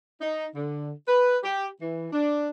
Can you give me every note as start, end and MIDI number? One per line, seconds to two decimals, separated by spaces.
0.21 0.45 63
0.55 0.90 50
1.07 1.37 71
1.43 1.67 67
1.81 2.07 52
2.13 2.50 62